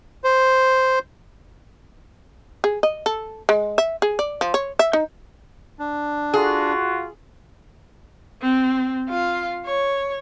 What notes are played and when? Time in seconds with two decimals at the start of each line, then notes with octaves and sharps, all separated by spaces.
0.24 C5
2.64 G#4
2.83 D#5
3.06 A4
3.49 G#3
3.78 E5
4.02 G#4
4.19 D5
4.41 F3
4.54 C#5
4.79 E5
4.93 D#4
5.79 D4
6.34 F4 F#4 G#4
8.42 C4
9.09 F4 F5
9.65 C#5